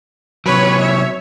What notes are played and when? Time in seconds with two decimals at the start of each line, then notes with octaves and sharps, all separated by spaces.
0.46 C3 F#3 B4 C#5
0.81 E5